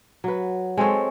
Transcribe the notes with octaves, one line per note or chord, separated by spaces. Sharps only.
F#3 B4
G#3 C4 A4 C#5